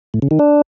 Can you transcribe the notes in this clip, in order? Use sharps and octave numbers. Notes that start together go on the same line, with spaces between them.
A2
C#3
D#3
D4